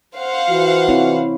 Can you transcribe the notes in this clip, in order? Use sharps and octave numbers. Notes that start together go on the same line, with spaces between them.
C5 F5 F#5
E3 F4 F#4
C4 E4 C#5